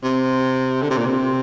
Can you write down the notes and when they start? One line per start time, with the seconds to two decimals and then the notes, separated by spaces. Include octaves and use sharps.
0.03 C3
0.83 D3
0.90 C3
0.98 A#2
1.07 C3